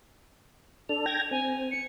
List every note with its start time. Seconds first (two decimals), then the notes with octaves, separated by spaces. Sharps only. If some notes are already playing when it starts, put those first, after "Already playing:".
0.89 D4 A4 F7
1.06 G5 G#6 A#6
1.31 C4 G#5
1.71 C#7